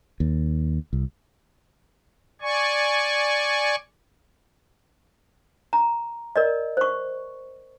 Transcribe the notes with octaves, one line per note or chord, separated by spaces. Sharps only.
D#2
C2
D5 G#5 C#6
A#5
A#4 D5 D#5
C5 C#6